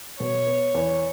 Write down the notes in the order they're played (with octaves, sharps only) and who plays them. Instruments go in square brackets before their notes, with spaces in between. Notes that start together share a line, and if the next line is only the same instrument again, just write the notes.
[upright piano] B2 [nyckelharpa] C#5
[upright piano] B3
E2